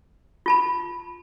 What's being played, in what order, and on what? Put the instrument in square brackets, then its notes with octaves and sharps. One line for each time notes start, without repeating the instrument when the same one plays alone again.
[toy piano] F4 A5 B5